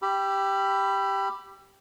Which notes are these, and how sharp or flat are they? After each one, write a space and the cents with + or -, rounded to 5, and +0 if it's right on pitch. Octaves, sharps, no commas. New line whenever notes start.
G4 +0 B5 +0 E6 +40